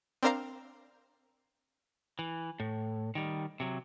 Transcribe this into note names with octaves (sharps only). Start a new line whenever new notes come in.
C4 D4 A#4 C5 F5 A#5
E3
A2
D#3 G3
C3 F#3